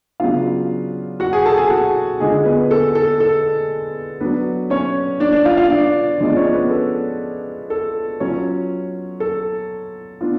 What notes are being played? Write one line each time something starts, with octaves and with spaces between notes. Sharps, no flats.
C#3 F#3 B3 D4 F4 F5
F#4 F#5
G#4 G#5
A4 A5
G#4 G#5
F#4 F#5
D3 G#3 D4 F4 G#4 G#5
B3 B4
A4
A4
A4
F#3 B3 D4 B4
C#4 C#5
D4 D5
D4 D5
F4 F5
F4 F5
D4 D5
F3 G#3 B3 D4 F4 D5
C#4 C#5
B3 B4
A4
A4
F#3 C#4 F4 C#5
A4
B3 D4 F4